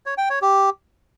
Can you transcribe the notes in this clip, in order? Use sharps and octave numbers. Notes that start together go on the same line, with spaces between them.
C#5
G5
C#5
G4